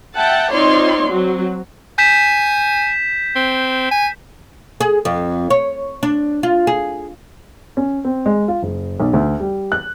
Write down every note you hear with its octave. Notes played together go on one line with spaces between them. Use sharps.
E5 F#5 G5 A5
C4 D#4 F4 C#5 D5 C6
F#3 C4
G#5 G6 B6 E7
C4
G#5
G#4
F2
C#5
D4
F4
G#4
C#4
C4
G#3
F4
F#1
B1
D2
G3
F#6